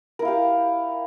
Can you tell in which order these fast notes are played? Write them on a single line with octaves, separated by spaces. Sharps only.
A#4 E4 F5 G4